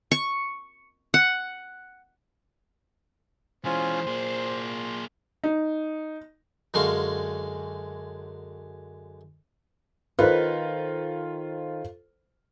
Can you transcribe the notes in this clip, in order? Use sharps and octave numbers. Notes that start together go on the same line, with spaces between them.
C#6
F#5
E3 G#3 C#4 F4 C5 G#5
A#2 A#3 G#4 C6
D#4
F#2 D3 G#3 C#4 F5
D#3 F4 A4 B4 C5